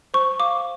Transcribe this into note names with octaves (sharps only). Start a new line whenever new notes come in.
C5 C#6
F5 D6